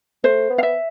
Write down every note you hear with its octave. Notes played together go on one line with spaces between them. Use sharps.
A3 C5
B3
F5
E5